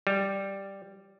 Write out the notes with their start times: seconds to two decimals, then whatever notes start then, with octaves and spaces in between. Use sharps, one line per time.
0.07 G3